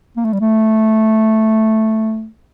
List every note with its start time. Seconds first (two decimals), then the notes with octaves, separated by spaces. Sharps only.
0.17 A#3
0.25 A3
0.33 G3
0.41 A3